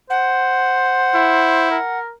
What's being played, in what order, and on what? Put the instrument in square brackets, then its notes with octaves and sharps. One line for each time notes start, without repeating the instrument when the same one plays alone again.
[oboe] C5 [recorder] F#5
[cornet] E4
[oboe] A#4